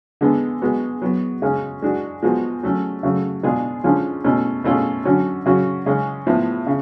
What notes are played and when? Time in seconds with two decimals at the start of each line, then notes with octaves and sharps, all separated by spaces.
0.21 D3 G#3 B3
0.61 G#3 B3 F#4
1.02 F#3 B3 F#4
1.42 C#3 G#3 C#4 G#4
1.82 G#3 D4 F#4
2.23 F3 G#3 B3 F#4
2.63 F#3 A3 C#4
3.03 C#3 F#3 A3
3.43 B2 G#3 D4 F4 G#4
3.84 D3 F3 G#3 C#4 F4
4.24 B2 A3 C#4
4.64 B2 A3 C#4 F4 G#4
5.05 D3 F#3 C#4 F#4
5.46 C#3 F#3 C#4 F#4
5.86 C#3 G#3 C#4
6.27 A2 F3 B3
6.67 C#3